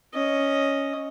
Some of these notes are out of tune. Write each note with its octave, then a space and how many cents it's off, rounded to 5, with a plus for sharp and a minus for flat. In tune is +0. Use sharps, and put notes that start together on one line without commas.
C#4 +0 D#5 +0